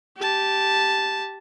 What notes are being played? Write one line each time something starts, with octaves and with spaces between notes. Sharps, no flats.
G4 A5